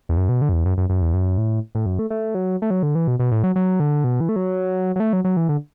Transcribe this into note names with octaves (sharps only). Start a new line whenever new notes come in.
E2
F#2
B2
D3
F#2
E2
F#2
F#2
F#2
E2
F#2
A2
A2
F#2
A3
A3
F#3
A3
F#3
D3
E3
B2
B2
A2
F#3
F#3
D3
B2
E3
A3
F#3
F#3
A3
F#3
F#3
E3
D3